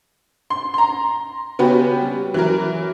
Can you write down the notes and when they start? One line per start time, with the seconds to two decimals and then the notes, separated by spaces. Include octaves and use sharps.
0.50 C6
0.74 A#5 C6
1.59 C#3 B3 C#4 F#4 G4 B4
2.02 G3
2.34 E3 F#3 A#4